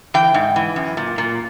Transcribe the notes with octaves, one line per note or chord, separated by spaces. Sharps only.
E3 G5
G#2
E3
F#2
A#2
A#2